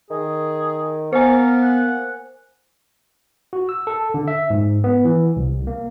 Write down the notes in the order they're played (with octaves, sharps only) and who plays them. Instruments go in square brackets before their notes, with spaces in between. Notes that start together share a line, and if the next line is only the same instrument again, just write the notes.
[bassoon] D#3 [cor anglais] G#4
[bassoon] A#3 [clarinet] B3 [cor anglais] A#4 [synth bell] C5 G#5
[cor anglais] F#5
[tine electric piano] F#4
E6
A4
D3
E5
G#2
B3
E3
C2
A#3